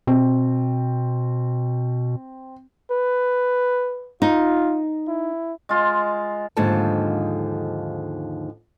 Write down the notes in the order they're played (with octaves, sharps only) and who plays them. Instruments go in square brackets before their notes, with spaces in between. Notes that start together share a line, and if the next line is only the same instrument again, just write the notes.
[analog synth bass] B2 [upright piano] C4
[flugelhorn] B4
[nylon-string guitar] D#4 [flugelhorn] F4
[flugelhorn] E4
[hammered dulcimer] G#3 F4
[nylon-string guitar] D#2 G#2 D3 F3 A5